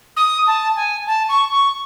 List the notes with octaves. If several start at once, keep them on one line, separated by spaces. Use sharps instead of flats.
D#6
A5
G#5
A5
C#6
C#6